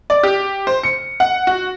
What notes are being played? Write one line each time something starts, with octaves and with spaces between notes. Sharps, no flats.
D5
G4
C5
C#7
F#5
F#4